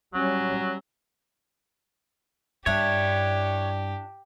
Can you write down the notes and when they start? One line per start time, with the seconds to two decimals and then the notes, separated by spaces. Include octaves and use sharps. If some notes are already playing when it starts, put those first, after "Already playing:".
0.14 F#3 G3 C#4
2.66 G2 D4 E4 G4 C#5